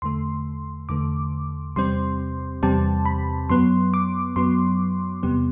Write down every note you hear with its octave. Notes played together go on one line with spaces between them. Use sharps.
E2 D3 A3 C6
E2 D3 A3 D6
E2 C3 G3 C4 C6
E2 C3 G3 C4 A5
B5
F#2 F#3 B3 C6
D6
F#2 F#3 B3 C6
E2 C3 G3 B3